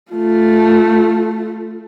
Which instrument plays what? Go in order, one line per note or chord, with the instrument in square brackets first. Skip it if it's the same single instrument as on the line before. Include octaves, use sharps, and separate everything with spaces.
[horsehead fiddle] A3 F4